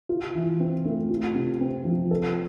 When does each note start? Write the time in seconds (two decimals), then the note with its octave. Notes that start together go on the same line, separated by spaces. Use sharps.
0.09 F4
0.35 E3
0.60 C4
0.85 A3
1.10 F4
1.35 C3
1.61 C4
1.85 F3
2.11 A4